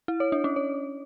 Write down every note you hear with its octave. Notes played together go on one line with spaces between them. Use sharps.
E4
C#5
D4
C#4
C#5